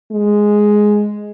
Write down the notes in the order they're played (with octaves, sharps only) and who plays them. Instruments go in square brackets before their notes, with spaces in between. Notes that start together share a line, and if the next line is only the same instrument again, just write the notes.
[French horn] G#3